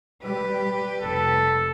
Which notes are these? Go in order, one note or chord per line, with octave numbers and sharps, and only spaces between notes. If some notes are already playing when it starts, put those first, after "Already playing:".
G3 G4 B4
F1 A4